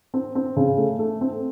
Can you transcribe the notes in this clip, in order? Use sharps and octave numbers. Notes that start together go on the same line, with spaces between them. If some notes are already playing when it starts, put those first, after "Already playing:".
C4
C4
C#3
A3
A3
C4